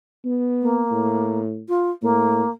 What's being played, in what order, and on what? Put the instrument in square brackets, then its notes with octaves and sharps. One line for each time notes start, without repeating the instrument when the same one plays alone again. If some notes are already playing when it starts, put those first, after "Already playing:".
[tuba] B3
[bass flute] A#3
[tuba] A2
[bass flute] F4
[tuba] A2 [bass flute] A#3